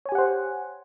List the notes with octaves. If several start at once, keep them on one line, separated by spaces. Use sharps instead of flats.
G4 C5 C#5 F#5 G#5